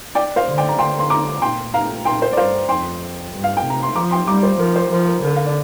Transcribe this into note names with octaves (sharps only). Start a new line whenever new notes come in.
D5 G5
C5 F5
D3
D5 G5
A#5
D3 G5 C6
C6
A#5 D6
A#2 G5 C6
F5 A#5
A#2 G5 C6
C5
D5
G2 C5 F5
F2 G5 C6
G2
F5
G5
C3
A#5
C6
F3 A#5 D6
G5 C6
G3 A#5 D6
C5
F3 A#4
C5
F3 A#4
A#4
D3 A#4
F5
D5